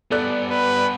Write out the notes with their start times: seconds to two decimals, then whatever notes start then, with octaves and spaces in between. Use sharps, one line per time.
0.11 G2 B3 A4 D5 F#6
0.50 B4